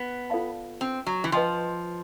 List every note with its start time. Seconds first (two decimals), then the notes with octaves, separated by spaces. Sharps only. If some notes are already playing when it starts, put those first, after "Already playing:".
Already playing: B3
0.30 F4 A4 D5 F5 A5
0.81 C4
1.06 F#3
1.24 E3
1.32 F3 B4 D#5 G5 C6